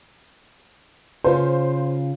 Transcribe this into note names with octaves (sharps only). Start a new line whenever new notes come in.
C#3 F4 C5